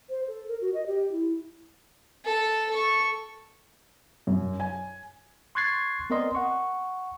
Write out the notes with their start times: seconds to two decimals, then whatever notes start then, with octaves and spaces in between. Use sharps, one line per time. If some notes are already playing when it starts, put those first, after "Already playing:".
0.10 C5
0.28 A4
0.48 A#4
0.61 F#4
0.74 D#5
0.86 G4
1.12 E4
2.25 A4
2.71 A4 C#6
4.27 F#2
4.60 G#5
5.55 C6 C#6 F#6 G#6 A6 C7
6.10 B3 C4 A#4 D5 D#5 C6
6.35 F#5 C#6